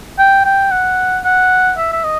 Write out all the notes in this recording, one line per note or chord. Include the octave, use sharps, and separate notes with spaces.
G5
G5
F#5
F#5
E5
E5
D#5